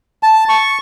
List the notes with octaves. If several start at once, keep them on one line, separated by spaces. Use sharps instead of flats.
A5
C#6